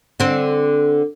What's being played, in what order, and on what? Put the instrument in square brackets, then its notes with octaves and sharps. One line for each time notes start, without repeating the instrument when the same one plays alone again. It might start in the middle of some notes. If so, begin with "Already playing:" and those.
[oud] D3 C4